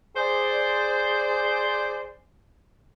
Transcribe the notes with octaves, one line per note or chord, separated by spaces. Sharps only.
G#4 C5 D5